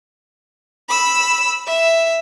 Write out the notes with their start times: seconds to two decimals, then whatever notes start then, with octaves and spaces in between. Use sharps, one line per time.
0.89 B5 E6
1.66 E5